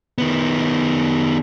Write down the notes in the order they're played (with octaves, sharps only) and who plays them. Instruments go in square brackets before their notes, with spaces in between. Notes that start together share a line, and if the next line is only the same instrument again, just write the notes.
[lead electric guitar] D#3 B3